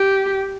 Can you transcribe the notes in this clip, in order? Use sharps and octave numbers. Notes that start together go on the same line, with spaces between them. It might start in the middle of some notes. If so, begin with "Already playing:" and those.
Already playing: G4